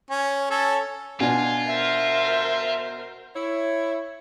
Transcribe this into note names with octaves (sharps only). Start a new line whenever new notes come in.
C#4
C#4 A4
B2 D4 F4 G#5
A#4 C5 E5
E4 C#5